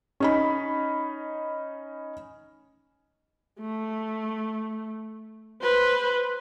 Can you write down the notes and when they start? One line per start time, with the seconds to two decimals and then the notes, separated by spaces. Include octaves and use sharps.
0.20 C#4 D#4 B5
3.60 A3
5.62 B4 C5